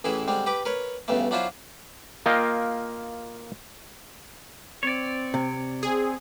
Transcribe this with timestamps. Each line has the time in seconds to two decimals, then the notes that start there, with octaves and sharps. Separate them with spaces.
0.04 A1 A2 E3 E4 G#4
0.28 D3 G3 G#3 C4
0.46 G4 B4 D6
0.65 A#4 B4 C#5
1.08 E2 G2 C#3 A3
1.31 F#3 D4 E4 F4 C5
2.26 A#3 F4 D#5 G5
4.83 C4 C#5 D5
5.34 C3
5.83 C4 G#4